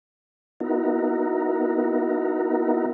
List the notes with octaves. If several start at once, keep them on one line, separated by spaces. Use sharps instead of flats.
B3 D#4 E4 F#4 A#4